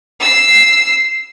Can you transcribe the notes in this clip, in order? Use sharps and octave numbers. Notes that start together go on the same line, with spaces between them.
E6 C7